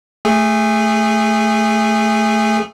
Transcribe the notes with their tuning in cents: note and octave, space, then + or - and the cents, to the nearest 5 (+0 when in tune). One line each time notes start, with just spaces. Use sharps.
A3 +0 G#4 -20